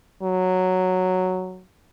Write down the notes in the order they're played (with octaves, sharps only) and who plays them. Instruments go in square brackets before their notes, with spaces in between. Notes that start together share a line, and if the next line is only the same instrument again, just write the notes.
[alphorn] F#3